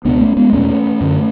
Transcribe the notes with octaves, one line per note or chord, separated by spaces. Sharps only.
C#2 B2 B3 D4
A3 C#4
G#3 B3
E2 B2 A3 C#4
F#2 D3